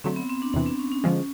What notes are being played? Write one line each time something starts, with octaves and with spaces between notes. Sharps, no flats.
D3 F#3 A3 C4
B3
C4
D4
E2 C3 E3 D4
C4
C#4
C#4
D3 F3 G#3